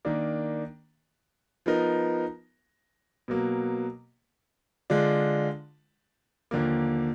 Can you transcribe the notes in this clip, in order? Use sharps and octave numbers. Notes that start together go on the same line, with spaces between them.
D#3 A#3 D4
F3 B3 D#4 A#4
B2 F#3 A#3
D3 G#3 D4 F4
D#2 D3 F3 A#3